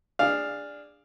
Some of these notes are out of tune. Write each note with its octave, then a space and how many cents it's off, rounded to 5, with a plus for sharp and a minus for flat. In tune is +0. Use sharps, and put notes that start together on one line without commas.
D4 +0 G#4 -20 F5 +0